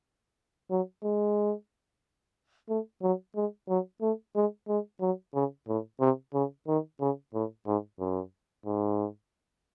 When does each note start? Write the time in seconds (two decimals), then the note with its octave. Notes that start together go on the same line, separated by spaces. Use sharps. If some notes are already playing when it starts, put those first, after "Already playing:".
0.71 F#3
1.03 G#3
2.69 A3
3.02 F#3
3.36 G#3
3.69 F#3
4.02 A3
4.36 G#3
4.68 G#3
5.01 F#3
5.34 C#3
5.68 A2
6.00 C3
6.34 C#3
6.68 D#3
7.00 C#3
7.34 A2
7.67 G#2
8.00 F#2
8.66 G#2